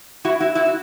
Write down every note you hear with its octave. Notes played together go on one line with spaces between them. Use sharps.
E4 F#4
E4 F#4
E4 F#4
F#4